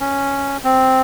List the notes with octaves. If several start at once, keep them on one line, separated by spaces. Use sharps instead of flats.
C#4
C4